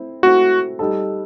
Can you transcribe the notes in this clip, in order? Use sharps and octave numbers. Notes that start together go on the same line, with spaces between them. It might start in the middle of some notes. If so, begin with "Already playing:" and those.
Already playing: A3 C4 E4
A3 C4 E4 F#4
G3 D#4 A4